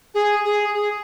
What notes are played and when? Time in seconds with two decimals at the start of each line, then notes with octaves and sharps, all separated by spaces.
0.14 G#4
0.44 G#4
0.74 G#4